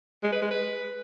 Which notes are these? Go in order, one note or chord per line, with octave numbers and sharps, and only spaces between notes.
G#3
B4
G#3
B4